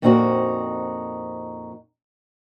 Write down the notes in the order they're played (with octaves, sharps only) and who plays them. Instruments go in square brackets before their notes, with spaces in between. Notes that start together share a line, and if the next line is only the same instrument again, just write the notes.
[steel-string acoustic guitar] F2 A#2 C4 D#4 F4 F#4